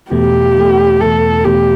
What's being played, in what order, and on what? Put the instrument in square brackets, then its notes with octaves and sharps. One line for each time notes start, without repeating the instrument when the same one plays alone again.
[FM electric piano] E2 B2 A3 [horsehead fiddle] G4
[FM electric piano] E2 B2 A3
[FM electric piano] E2 B2 A3 [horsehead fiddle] A4
[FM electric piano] E2 B2 A3 [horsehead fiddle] G4